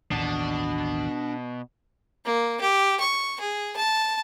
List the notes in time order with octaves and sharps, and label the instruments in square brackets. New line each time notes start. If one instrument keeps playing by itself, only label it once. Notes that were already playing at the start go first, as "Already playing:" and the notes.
[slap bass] A1 D#2 D#3 [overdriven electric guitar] B2 [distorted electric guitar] D4 A5
[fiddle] A#3
G4
C#6
G#4
A5